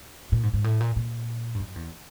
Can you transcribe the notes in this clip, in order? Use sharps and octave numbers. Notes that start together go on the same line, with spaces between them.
A#2
G#2
G#2
A2
A#2
A#2
G2
F#2
E2